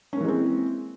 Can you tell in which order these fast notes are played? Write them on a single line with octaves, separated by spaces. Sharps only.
C#4 A#3 E3 G#3 C4